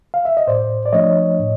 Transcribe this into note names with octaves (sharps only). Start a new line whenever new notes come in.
F5
E5
D#5
A2 C5 D5
D5
F3 A3 D4 C#5 D#5
A2